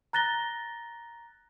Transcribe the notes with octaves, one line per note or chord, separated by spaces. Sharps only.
A#5 F#6 A6 A#6 G7